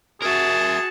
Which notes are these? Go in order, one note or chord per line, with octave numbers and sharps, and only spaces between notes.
F#4 G#4 A#4 E5 A5